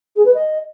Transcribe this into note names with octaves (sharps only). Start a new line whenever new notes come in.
G#4
B4
D#5